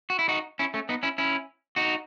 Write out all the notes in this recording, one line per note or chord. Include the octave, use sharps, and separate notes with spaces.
F#4
E4
D#4 F#4
C#4 E4
A3 C#4
B3 D#4
C#4 E4
C#4 E4
D#4 F#4